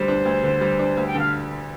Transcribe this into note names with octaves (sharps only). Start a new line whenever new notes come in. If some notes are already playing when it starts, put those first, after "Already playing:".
Already playing: D2 D3 G3 C5
D4
D2
D3
G3
D4
D2
G5
D3 F5